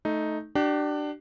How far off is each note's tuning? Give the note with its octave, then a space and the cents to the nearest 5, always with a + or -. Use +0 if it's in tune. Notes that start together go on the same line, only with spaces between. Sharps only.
A3 -10 D#4 +0
D4 +15 G4 -35